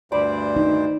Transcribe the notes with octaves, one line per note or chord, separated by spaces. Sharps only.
D2 G2 C5 D5 B5
D#4